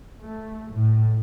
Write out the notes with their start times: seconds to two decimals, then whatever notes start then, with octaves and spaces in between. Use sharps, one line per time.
0.21 A3
0.72 A2